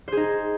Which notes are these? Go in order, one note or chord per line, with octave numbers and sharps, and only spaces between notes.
D#4 G#4 C5